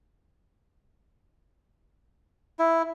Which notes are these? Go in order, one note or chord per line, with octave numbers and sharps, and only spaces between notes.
E4